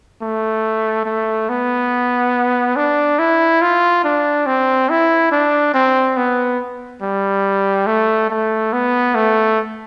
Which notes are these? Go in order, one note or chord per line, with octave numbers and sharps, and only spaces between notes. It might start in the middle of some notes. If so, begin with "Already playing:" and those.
A3
A3
B3
D4
E4
F4
D4
C4
E4
D4
C4
B3
G3
A3
A3
B3
A3